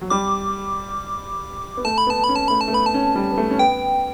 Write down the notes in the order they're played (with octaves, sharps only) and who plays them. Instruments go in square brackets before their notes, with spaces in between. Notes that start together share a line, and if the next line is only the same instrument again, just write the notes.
[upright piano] F#3
[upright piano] G3 [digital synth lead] D6
[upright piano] B3
[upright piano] A3 [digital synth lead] A5
[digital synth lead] B5
[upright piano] B3 [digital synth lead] A5
[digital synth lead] B5
[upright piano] C#4
[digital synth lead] A5
[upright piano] A3 [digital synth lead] B5
[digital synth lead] A5
[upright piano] A3
[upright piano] B3 [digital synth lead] B5
[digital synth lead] A5
[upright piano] C#4
G3
B3
A3
C#4
[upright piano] B3 [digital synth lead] G5